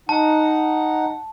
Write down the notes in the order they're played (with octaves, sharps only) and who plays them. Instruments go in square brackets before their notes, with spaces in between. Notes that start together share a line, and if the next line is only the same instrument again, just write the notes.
[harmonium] D#4 F#5 [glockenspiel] A5